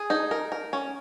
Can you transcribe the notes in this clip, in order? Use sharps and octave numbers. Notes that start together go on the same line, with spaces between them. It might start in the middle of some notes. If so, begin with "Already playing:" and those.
Already playing: G#4
D#4
A#4
A#4
C#4